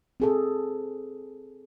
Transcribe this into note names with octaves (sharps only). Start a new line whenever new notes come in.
C4 G#4 A4